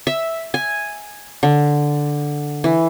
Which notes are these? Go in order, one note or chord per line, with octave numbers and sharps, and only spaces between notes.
E5
G#5
D3
E3